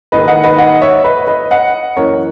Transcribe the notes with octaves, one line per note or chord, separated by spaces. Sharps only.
G#2 D#3 A#3 B4 D#5
D#5 F#5
B4 D#5
D#5 F#5
C#5 E5
B4 D#5
B4 D#5
D#5 F#5
F#2 E3 A#3 A#4 C#5